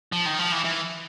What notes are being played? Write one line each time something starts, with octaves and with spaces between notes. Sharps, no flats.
F3
D#3
F3
E3
E3